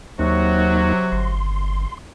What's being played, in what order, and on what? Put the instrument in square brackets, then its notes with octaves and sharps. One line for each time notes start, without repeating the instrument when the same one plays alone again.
[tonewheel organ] D#2 A#3 D#4 [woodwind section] C3 F#3 F#4
[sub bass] G1 [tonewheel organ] C6